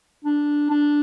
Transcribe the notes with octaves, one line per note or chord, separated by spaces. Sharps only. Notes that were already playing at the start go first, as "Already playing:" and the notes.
D4
D4